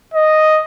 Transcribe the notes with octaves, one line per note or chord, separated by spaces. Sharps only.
D#5